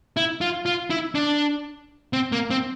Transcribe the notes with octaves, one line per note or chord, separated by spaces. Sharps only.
E4
F4
F4
E4
D4
C4
A#3
C4